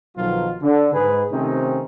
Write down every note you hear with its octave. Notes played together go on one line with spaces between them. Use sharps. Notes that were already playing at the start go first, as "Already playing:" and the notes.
B1 B2 D#3 F3 F#3 F4
D3
G#2 G#4 B4
C3 D#3 A3 C4 C#4 D#4